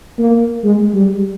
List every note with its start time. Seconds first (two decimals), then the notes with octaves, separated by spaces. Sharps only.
0.19 A#3
0.64 G#3
0.94 G3